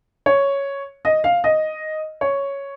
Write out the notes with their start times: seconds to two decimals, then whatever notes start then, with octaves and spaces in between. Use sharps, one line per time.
0.26 C#5
1.05 D#5
1.24 F5
1.44 D#5
2.21 C#5